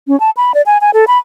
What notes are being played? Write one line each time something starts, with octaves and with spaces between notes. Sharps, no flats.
C#4
A5
B5
D5
G#5
G#5
A4
B5